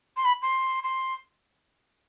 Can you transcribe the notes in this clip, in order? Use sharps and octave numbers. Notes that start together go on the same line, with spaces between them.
C6
B5
C6
C6